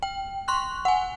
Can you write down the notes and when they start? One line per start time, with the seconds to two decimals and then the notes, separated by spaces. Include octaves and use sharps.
0.03 G5
0.48 C6 C#6 F#6
0.85 F#5 G#5